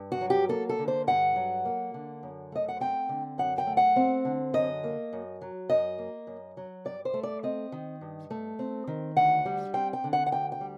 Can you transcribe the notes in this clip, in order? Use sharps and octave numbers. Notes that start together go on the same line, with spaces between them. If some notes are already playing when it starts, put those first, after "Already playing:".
Already playing: G2
F#4
F#3
G4
A#3 A4
A4
D3
C5
G2 F#5
F#3
A#3
D3
F#2
A3 D#5
F#5
C4 G5
D3
F#2 F#5
G5
A3
F#5
C4
D3
F#2 D#5
A#3
F#2
F#3
F#2 D#5
A#3
F#2
F#3
G2 D5
C5
A3
D5
C4 D#5
D#3
G2
A3
C4
D#3
D2 F#5
G3
C4 G5
G5
D3
F#5
F#5
D2 G5
G5
G3